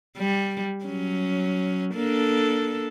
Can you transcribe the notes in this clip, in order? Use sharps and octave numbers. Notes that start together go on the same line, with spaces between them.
G3
F#3 C#4
A#3 D4 A4